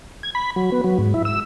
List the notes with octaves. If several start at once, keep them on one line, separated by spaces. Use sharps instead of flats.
G#6
B5
F#3
B3
F#3
G#2
E4
E6